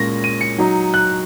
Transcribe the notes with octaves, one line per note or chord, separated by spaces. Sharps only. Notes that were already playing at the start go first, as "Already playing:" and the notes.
Already playing: A#2 G#3 C#4 A#6
D#7
C#7
F#3 D#4
F#6